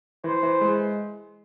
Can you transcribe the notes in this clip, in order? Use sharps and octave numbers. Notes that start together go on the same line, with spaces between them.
E3 C5
E3
G#3